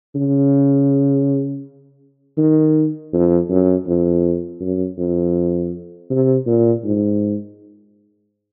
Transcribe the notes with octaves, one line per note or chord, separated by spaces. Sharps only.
C#3
D#3
F2
F#2
F2
F#2
F2
C3
A#2
G#2